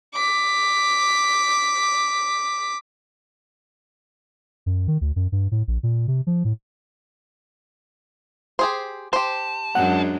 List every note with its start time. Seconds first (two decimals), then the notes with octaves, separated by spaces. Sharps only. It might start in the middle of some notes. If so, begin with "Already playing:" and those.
0.14 D6 B6
4.66 F#2
4.88 D#3
5.01 D2
5.16 F#2
5.32 G2
5.52 A2
5.68 A#1
5.83 A#2
6.08 C3
6.27 F3
6.45 A2
8.59 G4 G#4 C5
9.13 G4 C5 A5
9.75 F#2 G#3 D4 F#5